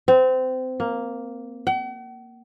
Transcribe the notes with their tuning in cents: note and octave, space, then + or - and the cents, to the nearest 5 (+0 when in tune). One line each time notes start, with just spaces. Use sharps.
C4 -25
A#3 +0
F#5 +45